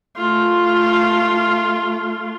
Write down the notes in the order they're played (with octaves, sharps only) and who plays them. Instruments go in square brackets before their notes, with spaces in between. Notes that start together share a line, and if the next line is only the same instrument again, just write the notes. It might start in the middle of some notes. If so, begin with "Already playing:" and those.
[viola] A3 F4